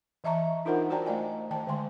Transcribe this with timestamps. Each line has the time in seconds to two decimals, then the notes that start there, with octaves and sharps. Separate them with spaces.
0.24 E3 D#5 E5 A5 A#5 C#6
0.65 D4 D#4 F4 A#4 C5 F#5
0.90 F#4 C5 D5 G5 A5 A#5
1.06 A3 D5 D#5 G#5
1.51 D#3 G5 A5
1.67 D3 D#3 G#3 G#5 C6